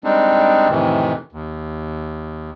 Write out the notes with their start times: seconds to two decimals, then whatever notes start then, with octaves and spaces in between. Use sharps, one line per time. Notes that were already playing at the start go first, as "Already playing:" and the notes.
0.04 G3 G#3 C4 D4 D#4
0.70 F2 A2 C3 D#3 E3
1.32 D#2